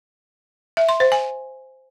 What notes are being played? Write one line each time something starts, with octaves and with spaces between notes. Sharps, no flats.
E5
C6
C5
G#5